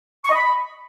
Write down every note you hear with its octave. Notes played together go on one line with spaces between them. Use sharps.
C#6
D#5
B5